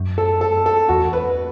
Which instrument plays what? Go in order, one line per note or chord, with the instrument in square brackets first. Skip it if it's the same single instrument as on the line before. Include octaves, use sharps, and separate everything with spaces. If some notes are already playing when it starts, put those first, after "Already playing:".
Already playing: [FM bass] F#2
[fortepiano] A4
A4
A4
[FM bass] E2 [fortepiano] F#4
[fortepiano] B4